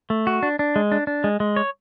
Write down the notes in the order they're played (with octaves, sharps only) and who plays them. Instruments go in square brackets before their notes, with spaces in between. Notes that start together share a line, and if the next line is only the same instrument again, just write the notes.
[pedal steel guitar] A3
F#4
D4
D4
G#3
D4
D4
G#3
G#3
C#5